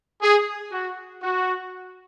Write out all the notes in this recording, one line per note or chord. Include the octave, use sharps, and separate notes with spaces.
G#4
F#4
F#4